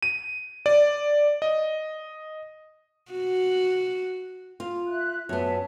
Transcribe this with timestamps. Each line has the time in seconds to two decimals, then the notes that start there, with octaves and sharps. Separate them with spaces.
0.03 D#7
0.66 D5
1.42 D#5
3.12 F#4
4.60 F4
4.88 E5 F#6
5.29 F#2 B3 E5 A5